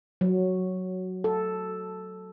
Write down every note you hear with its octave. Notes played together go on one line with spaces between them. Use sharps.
F#3
A4